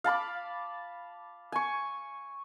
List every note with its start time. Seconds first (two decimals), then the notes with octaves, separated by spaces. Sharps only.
0.04 F5 A5 B5 D6
1.52 G#5 C#6